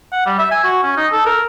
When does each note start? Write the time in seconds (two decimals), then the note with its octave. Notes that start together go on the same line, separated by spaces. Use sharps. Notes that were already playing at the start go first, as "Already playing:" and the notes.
0.12 F#5
0.26 G3
0.39 E5
0.51 G#5
0.64 F#4
0.83 C#4
0.97 D#4
1.12 A4
1.26 A#4